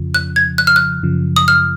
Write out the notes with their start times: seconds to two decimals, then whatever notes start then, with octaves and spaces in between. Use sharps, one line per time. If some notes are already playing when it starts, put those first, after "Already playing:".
Already playing: F2 C#3 F3
0.14 F#6
0.36 G#6
0.58 F#6
0.67 F6
0.76 F#6
1.03 F#2 C#3 F3
1.36 D#6
1.48 F6